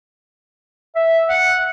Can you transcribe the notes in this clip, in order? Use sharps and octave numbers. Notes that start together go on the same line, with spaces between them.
E5
F#5